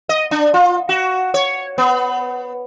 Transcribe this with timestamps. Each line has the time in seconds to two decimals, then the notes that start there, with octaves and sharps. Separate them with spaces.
0.09 D#5
0.31 D4
0.54 F4
0.89 F#4
1.34 C#5
1.78 B3